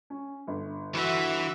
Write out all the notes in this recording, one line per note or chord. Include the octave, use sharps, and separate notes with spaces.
C#4
G1
E3 F#4 E5